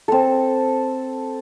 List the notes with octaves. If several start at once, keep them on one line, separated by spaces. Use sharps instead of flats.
C4 A4